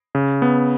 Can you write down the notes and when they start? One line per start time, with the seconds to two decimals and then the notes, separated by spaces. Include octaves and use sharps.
0.15 C#3
0.42 B3